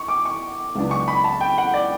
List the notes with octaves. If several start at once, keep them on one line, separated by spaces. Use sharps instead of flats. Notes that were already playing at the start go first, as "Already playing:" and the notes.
Already playing: C#6
D6
C#6
C#2 C#3 F#3 B3 D4
C#6
B5
A5
G5
F#5
D5